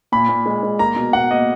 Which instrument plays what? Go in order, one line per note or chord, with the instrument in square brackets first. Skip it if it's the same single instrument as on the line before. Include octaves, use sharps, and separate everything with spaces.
[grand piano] A#2 B5
A#2
G#3
G#3
A#3 A#5
B2
B2 F#5
A#3 D#5